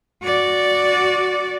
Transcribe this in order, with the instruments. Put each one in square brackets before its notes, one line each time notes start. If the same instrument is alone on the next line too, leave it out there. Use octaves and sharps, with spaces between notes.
[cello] F#4 D5